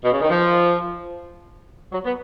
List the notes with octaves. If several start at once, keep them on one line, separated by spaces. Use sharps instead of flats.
B2
C#3
D#3
F3
F#3
B3